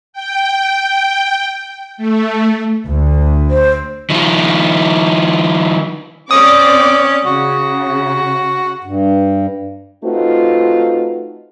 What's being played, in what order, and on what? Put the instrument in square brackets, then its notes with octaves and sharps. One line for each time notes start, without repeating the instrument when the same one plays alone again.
[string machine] G5
A3
[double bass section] D2 D3
[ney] C5
[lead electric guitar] D#3 F3
[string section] C4 D5 D6 [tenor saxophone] C#4 [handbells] D#6
[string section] C#3 [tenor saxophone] F#4
[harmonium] G2
[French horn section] A3 C4 D#4 F4 F#4 B4